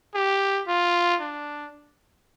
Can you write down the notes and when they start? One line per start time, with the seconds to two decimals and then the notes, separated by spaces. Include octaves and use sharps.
0.15 G4
0.68 F4
1.21 D4